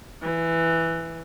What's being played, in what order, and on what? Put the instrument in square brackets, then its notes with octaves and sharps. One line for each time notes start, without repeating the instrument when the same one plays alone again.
[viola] E3